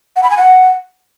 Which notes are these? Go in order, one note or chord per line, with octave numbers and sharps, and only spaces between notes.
F#5
B5
G#5
F#5